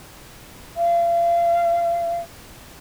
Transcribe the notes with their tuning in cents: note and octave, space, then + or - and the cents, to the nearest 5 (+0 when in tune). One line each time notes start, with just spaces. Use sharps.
F5 -35